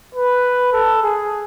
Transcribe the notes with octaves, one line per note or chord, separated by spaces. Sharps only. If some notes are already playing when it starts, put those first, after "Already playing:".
B4
A4
G#4